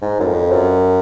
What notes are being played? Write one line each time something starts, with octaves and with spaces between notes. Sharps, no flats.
G#2
F#2
F2
F#2